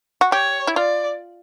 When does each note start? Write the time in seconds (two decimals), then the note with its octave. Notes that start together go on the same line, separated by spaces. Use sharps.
0.21 F#4
0.32 G4 C#5
0.67 E4
0.76 F4 D5